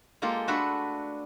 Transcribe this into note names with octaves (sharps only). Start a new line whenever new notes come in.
G#3 A#3 F4 G4 A4
A3 D4 F#4 B4 E5